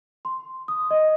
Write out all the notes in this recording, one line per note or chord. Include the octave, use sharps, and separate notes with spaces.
C6
D#6
D#5